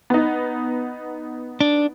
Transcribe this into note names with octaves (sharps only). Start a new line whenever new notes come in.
B3 D#4
D4